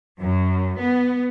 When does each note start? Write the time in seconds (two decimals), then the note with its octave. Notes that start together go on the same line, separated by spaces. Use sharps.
0.18 F#2
0.79 B3